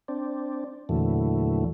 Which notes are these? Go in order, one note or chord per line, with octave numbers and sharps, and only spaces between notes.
C4 D4
E2 A#2 D3 E3 F#3 A3